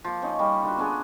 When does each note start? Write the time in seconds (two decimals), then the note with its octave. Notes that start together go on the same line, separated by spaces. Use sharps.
0.04 F3 A#3
0.22 C#4 D#4 C#5
0.39 G3 D#4 A#4
0.63 D3 F4 F#4
0.78 B3 C#4 D4 G#4